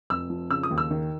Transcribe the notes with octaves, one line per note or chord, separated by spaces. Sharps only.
F1 E6
F3
C#3 E6
D#6
D#2
E6
D#3